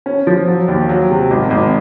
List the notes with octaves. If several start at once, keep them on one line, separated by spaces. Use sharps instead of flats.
C#4
F3
F#3
D#2
F#3
C3
G#1
G#1